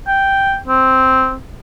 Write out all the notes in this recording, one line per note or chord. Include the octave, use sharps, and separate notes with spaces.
G5
C4